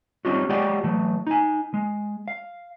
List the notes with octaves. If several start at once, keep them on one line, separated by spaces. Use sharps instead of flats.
G3 C4 C#4 D#4 F4 F#4
G#3 F#4 G4 D5 F#5 G5
E3 F#3 A3
D#4 G#5
G#3
F5